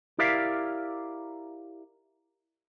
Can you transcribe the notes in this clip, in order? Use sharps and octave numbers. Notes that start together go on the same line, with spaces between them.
E4 G4 A#4 D5 E5 F5